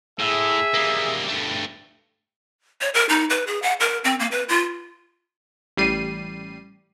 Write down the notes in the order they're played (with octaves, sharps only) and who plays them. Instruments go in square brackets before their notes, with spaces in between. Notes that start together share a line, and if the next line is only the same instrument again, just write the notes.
[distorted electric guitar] A2 [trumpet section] G#4 E5
[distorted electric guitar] G3 A#3
G2 A3
[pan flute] C#5
A#4
D#4
B4
G#4
F#5
A#4
C4
A#3
B4
F4
[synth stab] A1 G3 C7 D#7